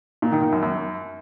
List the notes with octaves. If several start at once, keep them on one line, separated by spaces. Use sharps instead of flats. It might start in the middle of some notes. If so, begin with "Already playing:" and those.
A#2
D#3
D#3
F#2
F#2